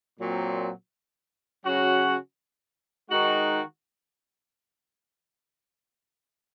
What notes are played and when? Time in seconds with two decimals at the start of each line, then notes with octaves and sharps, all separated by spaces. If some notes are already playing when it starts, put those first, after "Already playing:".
0.19 A#2 F#3 C4
1.64 C#3 F#3 C#4 F#4
3.11 D#3 G#3 D#4 F#4